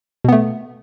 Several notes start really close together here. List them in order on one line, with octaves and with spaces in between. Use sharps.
B2 B3 A3